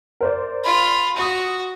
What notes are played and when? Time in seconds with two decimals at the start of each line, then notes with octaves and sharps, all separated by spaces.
0.21 A#4 C5 D5
0.63 F4 B5
1.16 F#4 D#6 D#7